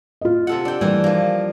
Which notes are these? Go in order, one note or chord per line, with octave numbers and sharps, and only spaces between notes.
F4 D#5
C3 A4 F#5
D4 G5
E3 G3 D4 A#4
F3 A#3